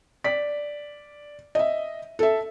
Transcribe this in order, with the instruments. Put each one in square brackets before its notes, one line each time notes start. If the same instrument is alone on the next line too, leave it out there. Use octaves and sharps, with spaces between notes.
[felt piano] D5 B6
D#5 E5
A4 E5